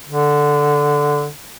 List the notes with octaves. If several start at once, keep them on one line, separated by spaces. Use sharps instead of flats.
D3